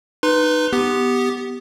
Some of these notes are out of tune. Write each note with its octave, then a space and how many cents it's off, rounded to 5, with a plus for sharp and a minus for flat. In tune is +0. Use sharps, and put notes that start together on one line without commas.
D#4 -20 B4 +0 C6 +0
B3 +0 G4 +0